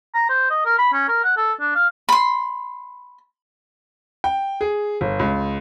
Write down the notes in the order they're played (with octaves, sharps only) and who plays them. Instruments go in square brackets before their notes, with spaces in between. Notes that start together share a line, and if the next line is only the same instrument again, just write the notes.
[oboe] A#5
C5
D#5
A#4
B5
C#4
A#4
F#5
A4
D4
F5
[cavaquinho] B5 C6
[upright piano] G5
G#4
G1
C#2